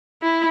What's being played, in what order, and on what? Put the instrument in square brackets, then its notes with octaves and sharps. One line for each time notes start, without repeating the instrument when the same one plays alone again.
[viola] E4